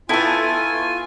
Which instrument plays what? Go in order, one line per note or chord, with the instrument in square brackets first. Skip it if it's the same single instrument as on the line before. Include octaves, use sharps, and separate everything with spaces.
[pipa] D#3 A3 [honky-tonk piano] B3 A4 A5 [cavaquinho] E4 [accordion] F4 G#5